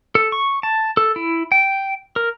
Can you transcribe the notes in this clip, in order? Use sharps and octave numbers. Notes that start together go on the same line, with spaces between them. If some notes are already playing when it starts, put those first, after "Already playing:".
A4
C#6
A5
A4
E4
G5
A#4